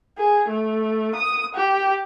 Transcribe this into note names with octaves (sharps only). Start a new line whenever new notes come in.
G#4
A3
D#6
G4